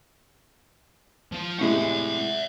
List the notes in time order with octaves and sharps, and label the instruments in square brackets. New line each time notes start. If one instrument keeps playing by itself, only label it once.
[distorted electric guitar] F3 F4
[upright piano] A2 C3 G#3 [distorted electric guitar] E5 F#5